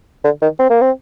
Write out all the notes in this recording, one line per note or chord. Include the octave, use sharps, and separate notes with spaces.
D3
D#3
C4
A#3
C4